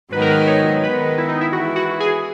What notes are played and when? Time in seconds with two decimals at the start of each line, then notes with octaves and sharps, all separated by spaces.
0.12 G#2 D#3 F#3 B3 D#4 B4
0.21 A#4
0.30 B4
0.47 C#5
0.83 D#3 G#3 B3 B4
1.18 E4
1.28 D#4
1.41 E4
1.52 E3 G#3 B3 E4 F#4
1.76 F#4
2.00 G#4